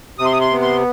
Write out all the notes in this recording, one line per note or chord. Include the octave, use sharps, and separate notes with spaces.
C3 D#6
C6
D#6
C6
B3
C6